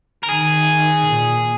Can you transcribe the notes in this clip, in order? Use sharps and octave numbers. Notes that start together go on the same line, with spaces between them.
A#4
D#3 G#4
A#2